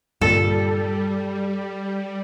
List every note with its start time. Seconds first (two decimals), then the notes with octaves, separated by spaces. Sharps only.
0.21 G2 A#2 D3 G3 A4